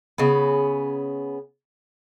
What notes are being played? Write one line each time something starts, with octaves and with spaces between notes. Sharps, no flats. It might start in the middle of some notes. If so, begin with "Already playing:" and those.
C#3 B3